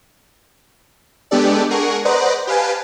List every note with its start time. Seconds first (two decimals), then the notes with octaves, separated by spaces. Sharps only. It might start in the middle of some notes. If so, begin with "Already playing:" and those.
1.31 G#3 B3 D4 G4 A4 D5
1.71 G#4 A#4 F#5 C#6
2.05 B4 C5 D5 D#5 F#5 A#5
2.47 G4 B4 F5 G#5 A5